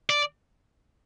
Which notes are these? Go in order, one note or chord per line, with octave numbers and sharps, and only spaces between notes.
D5